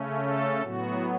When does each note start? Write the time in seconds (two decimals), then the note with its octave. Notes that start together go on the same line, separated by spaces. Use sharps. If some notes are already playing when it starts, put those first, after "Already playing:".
Already playing: C#3 A3 C#4
0.21 A4
0.62 A2 F#3 B3 F#4